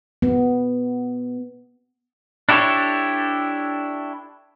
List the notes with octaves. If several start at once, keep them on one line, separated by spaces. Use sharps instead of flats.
B3
D4 E4 G4 A4 C#5